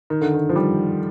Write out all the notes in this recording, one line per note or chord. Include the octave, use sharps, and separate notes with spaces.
D#3
D3
D#3
F3
G3